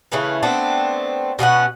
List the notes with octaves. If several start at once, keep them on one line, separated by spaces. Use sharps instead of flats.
C#3 E3 A3 B4
A3 B3 C4 D4
B2 B3 C#4 F#5